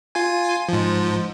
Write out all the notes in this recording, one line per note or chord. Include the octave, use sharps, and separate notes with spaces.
F4 G#5
G#2 F3